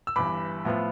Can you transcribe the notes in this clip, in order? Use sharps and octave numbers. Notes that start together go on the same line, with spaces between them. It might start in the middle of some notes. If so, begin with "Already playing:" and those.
E6
G1 G2 E3 B5 D6
A2 F3 B3 F4